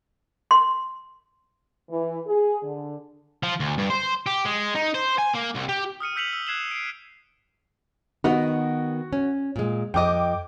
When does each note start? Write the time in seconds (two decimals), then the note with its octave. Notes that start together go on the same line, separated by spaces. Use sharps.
0.51 C6
1.90 E3
2.26 G#4
2.63 D3
3.43 F3
3.60 D2
3.78 G2
3.90 C5
4.26 G4
4.46 G#3
4.75 D#4
4.94 C5
5.18 G#5
5.34 A#3
5.55 C2
5.69 G4
6.00 D#6 F6 C#7 D#7
6.16 E6 G6 B6 C#7 F7 F#7
6.33 E6
6.47 F#6 G#6 C7 E7 F#7 G7
6.71 C7 D7
8.24 D#3 B3 D#4 F#4
9.13 C#4
9.56 A#2 G#3
9.94 F2 D#5 G5 D6